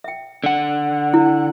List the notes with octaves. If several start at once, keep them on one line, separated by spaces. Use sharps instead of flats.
E5 G5
D3 F#5
E4